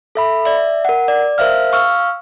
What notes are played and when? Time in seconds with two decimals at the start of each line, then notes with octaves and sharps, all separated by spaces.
0.15 A4 E5 B5
0.45 D5 E5
0.85 A#4 F#5
1.08 D5
1.38 A#4 C5 E5 F5 F6
1.72 F5 C#6 E6 F6